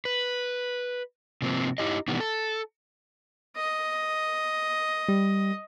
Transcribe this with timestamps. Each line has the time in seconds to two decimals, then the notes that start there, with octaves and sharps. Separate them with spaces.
0.05 B4
1.42 C3 F3 A#3 C4
1.78 D#4 E4 G4 D#5
2.08 B2 D#3 E3 G3 B3
2.20 A4
3.56 D#5
5.08 G3